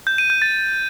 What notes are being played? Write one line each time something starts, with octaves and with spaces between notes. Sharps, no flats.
G6
D#7
G6
A6